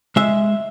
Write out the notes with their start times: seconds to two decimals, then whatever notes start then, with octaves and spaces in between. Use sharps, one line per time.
0.16 G#3 E5